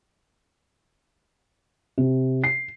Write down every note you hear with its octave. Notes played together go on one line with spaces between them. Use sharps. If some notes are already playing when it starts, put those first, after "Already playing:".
C3
C7